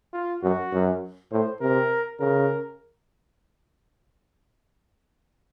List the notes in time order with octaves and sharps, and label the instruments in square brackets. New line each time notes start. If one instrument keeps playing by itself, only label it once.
[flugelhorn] F4
[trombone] F#2 [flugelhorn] F#4
[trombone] F#2
[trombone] A2 [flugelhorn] C5
[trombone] C3 [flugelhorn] A#4
[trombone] C#3 [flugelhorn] A#4